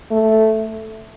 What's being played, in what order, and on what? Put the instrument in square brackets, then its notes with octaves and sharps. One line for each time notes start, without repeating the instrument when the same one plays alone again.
[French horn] A3